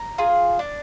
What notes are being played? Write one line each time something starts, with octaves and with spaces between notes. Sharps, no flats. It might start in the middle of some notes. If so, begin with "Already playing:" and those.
Already playing: A#5
F4 G#4
D4